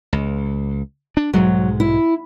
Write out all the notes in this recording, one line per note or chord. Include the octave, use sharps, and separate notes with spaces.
C#2
D4
B1 G#2 F#3 G#3
E4